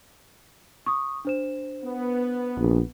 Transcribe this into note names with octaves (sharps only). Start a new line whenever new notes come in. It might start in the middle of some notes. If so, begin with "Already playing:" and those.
C#6 D#6
D4 C5 E7
B3
A#1